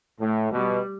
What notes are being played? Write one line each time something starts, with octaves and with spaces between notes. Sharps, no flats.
A2 A3
B2 G3